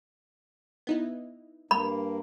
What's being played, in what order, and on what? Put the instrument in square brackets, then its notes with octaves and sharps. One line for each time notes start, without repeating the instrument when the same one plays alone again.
[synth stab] B3 D#4 E4
[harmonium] G2 A#3 [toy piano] B5